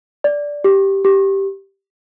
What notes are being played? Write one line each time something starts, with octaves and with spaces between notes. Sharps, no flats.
D5
G4
G4